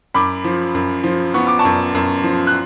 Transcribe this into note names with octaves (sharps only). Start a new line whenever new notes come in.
F#2 B5 D6
F3
F#2
F3
B3 C#6
D6
A5 C#6
F#2
F#2
F3
F#6